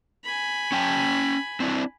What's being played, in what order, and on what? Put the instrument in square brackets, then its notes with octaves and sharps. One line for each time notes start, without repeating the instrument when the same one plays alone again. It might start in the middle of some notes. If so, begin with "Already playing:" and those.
[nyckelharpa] G#5 B5
[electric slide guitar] C#4 G5 A5
C4 D4 E4